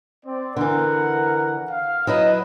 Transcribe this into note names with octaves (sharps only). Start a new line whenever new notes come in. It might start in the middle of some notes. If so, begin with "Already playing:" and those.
C4 D5
D3 E3 A#4 F#5
F5
F#3 E4 B4 D#5